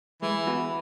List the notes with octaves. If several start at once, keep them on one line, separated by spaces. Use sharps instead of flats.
E3 G#3
B3 F#4 B4